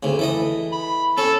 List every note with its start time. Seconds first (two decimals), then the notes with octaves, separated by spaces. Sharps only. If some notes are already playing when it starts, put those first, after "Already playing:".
0.03 D2 C#3
0.19 E3 A4 D#5
0.72 B5
1.18 C#4 A4